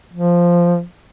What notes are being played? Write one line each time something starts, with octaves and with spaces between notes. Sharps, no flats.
F3